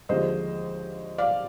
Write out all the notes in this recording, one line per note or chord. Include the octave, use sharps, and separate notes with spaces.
D#2 D3 F3 G#3 C5 D#5
D5 F5